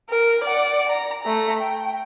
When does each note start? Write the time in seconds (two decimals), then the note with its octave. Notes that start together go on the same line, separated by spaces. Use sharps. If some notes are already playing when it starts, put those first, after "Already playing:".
0.10 A#4
0.44 D5 F#5
0.89 A#5
1.23 A3 A#5
1.61 G5